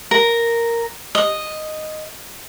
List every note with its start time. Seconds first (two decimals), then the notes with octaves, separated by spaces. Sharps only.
0.11 A#4
1.15 D#5